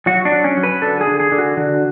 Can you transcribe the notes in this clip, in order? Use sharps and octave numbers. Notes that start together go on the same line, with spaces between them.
F#3 F#4
D4
F#3
C#4
F#3
B4
D3 A4
G#4
D3
G#4
D3
F#4
D3